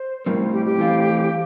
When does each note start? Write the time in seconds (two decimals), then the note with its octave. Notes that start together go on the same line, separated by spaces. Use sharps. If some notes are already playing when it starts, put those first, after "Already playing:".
Already playing: C5
0.26 A2 G3 C4 A#4
0.53 G4
0.65 G4
0.78 E3 A3 C4 F4